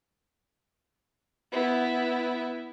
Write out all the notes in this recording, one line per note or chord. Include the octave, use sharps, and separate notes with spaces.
B3 E4